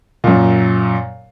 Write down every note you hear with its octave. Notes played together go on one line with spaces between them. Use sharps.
F#2 A#2